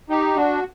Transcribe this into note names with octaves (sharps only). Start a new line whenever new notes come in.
D#4 G4
D4 F#4